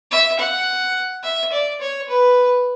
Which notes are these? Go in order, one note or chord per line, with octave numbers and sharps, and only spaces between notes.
E5
F#5
E5
D5
C#5
B4